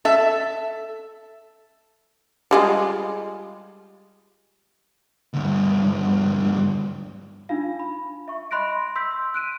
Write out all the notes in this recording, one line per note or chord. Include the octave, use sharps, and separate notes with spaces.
A4 E5
G3 G#3 F4
D2 G2
D4 D#4 F4 F5
B5
E5 C#6
D#5 B5 C6 F#6 A#6 D7
C6 E6 G6 B6
F#6 D7 D#7